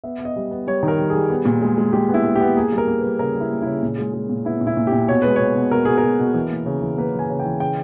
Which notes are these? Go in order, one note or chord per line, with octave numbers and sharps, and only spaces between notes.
B3 E5
B3
D#5
G3
B3
G3 C#5
D#3
A#4
G3
G#4
G3
B3
A#2
G#3
G#3
G#3 G4
B3 E4
G#3
B3 G4
A#3 G#4
G3
A#4
A#3
B4
G3
C#3 A#4
G3
E4
A#3
C#3 E4
A#2
G#3
G#3
A#2
B3 E4
A#2
E4
A#2
G4
A#2
B2 C#5
G#3 B4
B2 C#5
B2
B2 A#4
B2 G#4
A#4
B2
B2
E3
A#3
C#3
E3
A#3 B4
E3
G#5
C#3
G5
E3
C#3 G5